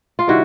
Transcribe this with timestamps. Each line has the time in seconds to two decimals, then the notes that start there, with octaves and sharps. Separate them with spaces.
0.19 F4
0.27 C3 D#3 G3 E4 F#4